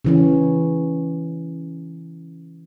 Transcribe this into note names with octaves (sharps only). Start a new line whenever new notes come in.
C#3 E3 C#4